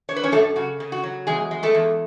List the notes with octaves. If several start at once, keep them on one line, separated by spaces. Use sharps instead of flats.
D4 C#5
B4
C#4 C#5
F#2 A3 A4
C#3 F#4
C#3
F#4
F#3
E2 G#3 G#4
G#3
A3 A4
E2